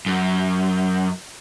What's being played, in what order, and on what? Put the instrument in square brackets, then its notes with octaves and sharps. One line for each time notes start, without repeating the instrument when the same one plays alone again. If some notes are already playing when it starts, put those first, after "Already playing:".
[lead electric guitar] F#2